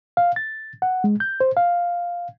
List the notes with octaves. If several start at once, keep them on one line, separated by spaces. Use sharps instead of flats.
F5
A6
F#5
G#3
G6
C5
F5